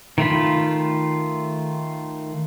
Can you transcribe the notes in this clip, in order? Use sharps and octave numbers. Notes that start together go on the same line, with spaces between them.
D#3 A3 F4 B5